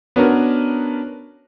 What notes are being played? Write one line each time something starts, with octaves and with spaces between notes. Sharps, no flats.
B3 C#4 D4 F#4 A#4